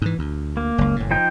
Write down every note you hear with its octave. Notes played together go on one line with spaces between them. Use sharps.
G#2 E3
D2
A#3
F#1 C#2
F#1 A2
F3 D#4 G5